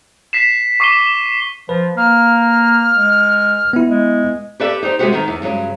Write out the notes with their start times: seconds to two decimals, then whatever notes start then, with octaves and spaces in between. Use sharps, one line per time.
0.33 B6 C7 E7
0.80 C#6 D6 C7 D#7 G7
1.69 F3 B4
1.97 A#3 F6
2.95 G#3
3.73 B3 E4
3.90 G#3
4.60 G4 A4 B4 D5 E5
4.83 D#4 G4 C5
4.99 C3 G#3 B3 C4 F#4 G4
5.13 D#3 B3 D#4 A#4
5.28 E2
5.42 G2 C#3 F#3 G#3